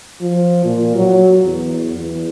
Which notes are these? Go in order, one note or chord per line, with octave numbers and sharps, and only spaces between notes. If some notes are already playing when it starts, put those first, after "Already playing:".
F3
A#2
F#3
E2
E2